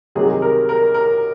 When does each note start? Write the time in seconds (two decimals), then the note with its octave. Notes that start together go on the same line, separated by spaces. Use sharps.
0.15 C2 C3 D#3 F#3 G#4
0.42 A#4
0.69 A#4
0.94 A#4